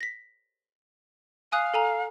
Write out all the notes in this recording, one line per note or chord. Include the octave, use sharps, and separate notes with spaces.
A#6 B6
F5 G#5 D#6 F#6
A4 G#5 A#5